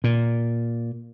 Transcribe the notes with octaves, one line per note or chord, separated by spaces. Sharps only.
A#2